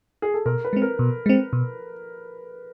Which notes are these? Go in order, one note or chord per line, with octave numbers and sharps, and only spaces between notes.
G#4
A4
B2 A#4
B4
G#3 C4
A#4
B2
G#3 C4
B2